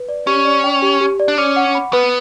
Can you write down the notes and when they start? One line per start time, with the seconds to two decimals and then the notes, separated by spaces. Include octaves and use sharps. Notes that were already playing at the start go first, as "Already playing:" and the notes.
Already playing: B4
0.09 D5
0.27 C#4 G4
0.45 D5
0.64 G5
0.82 G4
1.01 G4
1.20 D5
1.28 D4
1.38 C#4 D6
1.56 F#5
1.75 B5
1.93 B3 B4